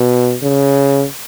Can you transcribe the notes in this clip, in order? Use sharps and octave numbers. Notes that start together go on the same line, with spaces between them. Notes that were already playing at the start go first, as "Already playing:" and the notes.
Already playing: B2
C#3